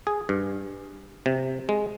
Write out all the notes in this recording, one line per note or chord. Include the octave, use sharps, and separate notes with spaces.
G#4
G2
C3
G#3